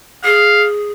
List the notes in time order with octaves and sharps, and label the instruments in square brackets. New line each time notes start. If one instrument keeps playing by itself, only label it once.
[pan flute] G#4 [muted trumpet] F5